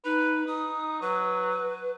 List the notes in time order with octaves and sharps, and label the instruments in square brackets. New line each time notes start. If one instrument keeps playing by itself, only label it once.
[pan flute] D#4 [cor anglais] B4
[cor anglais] D#4 [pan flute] D#6
[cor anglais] F#3 [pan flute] B4